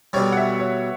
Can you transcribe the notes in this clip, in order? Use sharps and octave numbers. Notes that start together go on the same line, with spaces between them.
B1 B2 G3 C#5
F#5
E5
C#5